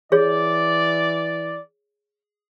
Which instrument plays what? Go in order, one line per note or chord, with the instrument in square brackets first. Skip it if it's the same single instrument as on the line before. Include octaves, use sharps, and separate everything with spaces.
[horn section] E3 D5 [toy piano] G#4 C#5